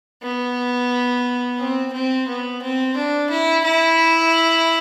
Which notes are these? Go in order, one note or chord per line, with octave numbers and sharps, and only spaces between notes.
B3
C4
C4
B3
C4
D4
E4
E4